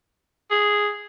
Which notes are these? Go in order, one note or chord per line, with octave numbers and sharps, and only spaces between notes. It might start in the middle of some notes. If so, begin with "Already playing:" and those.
G#4